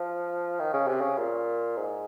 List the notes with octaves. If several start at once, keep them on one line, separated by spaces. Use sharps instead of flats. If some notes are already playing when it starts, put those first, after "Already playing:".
Already playing: F3
D#3
C#3
C3
C#3
A#2
G#2